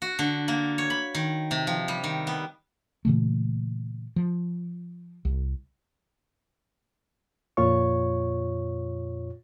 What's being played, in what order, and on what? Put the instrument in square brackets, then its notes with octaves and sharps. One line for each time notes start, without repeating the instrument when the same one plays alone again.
[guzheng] F#4
D3
A#3
C#5
B5
D#3
C3
F3
G3
D#3
B3
[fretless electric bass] A#2 C#3 E3 A3
F3
C2
[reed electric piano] F2 A#2 F4 C#5 C#6